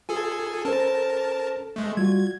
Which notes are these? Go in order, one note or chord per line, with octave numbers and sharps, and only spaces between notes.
F4 G#4 A4 G#5
C#4 A4 A#4 C5 A5
G#3 A3
G3 F4 F#4 G#6